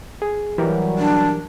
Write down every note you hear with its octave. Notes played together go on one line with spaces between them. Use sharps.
G#4
E3 F#3 G3 G4 A#4
D4